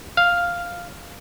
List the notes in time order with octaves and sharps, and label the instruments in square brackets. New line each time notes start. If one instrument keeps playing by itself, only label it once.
[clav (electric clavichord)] F5